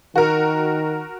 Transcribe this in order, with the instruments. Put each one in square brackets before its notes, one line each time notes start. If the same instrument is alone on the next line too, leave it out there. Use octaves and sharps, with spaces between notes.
[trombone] D#3 [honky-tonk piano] F#4 A#4